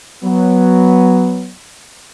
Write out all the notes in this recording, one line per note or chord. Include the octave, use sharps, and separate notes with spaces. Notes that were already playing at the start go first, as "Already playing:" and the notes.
F#3 B3